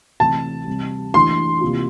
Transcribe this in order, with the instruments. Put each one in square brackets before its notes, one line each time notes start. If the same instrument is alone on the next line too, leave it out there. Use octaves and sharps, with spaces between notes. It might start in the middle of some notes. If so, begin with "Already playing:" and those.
[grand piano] C3 E3 A3 C4 [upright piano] A5
[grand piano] C3 G3 C4
[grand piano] E3 A3 D4 [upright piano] C6
[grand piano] C3 E3 A#3 F4